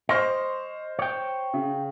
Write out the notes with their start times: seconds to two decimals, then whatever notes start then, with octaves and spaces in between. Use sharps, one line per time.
0.09 C5 D#5 C6 C#6 F6
0.99 C#5 G5
1.54 C#3